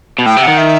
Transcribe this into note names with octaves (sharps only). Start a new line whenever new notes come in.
B2
A2 G5
C3
F#5
D#3
E5